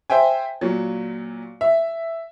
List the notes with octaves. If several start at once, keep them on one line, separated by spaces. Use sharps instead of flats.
C5 E5 G5 G#5
A#2 F#3
E5